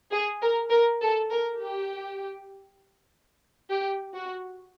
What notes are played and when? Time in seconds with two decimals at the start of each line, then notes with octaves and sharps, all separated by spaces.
0.11 G#4
0.41 A#4
0.71 A#4
1.01 A4
1.31 A#4
1.60 G4
3.70 G4
4.14 F#4